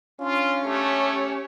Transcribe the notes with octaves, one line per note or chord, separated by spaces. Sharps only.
C#4 D4 F4
A3 G4 C#5